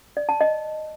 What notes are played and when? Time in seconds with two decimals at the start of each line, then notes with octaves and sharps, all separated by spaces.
0.17 D5
0.29 A5
0.41 D#5